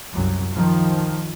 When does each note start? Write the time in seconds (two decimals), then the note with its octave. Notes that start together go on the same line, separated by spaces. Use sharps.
0.11 C2 F#2 F#3
0.55 D#3 F3